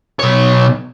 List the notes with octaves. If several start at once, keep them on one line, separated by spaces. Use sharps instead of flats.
B1 C#5